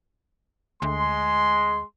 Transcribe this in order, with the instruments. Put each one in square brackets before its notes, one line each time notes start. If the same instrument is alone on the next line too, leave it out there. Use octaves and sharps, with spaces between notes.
[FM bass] D2 [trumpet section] G#3 C6